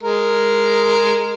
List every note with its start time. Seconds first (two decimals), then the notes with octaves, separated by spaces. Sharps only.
0.03 G#3 A#4